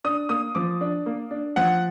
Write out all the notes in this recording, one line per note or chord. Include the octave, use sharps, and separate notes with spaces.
D4 D#6
A#3 D#6
F3 D6
D4
A#3
D4
F3 F#5